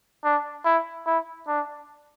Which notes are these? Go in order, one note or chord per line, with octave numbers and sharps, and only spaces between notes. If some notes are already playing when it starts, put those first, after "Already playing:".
D4
E4
E4
D4